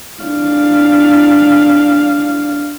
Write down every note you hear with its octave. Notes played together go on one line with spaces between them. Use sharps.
D4 F5